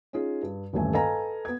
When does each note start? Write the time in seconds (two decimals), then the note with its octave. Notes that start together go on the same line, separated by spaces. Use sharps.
0.13 C#4 D#4 F4 G#4
0.43 G2
0.73 D#1 A1 G2 A3 G#5
0.93 A4 B4 D#5 F5 G#5 A#5
1.45 B3 G#6